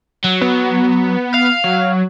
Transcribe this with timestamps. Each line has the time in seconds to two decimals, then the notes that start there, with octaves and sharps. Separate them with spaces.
0.24 F#3
0.42 B3
1.34 F5
1.64 F#3